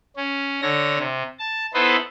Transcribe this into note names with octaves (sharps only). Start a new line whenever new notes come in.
C#4
D3 C#5 A#6
C3
A5
B3 D#4 E4 A4 B4 C5